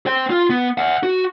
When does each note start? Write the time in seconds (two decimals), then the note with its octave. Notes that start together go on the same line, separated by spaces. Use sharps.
0.06 C5 G5
0.30 F4
0.50 B3
0.78 E5 F#5
1.03 F#4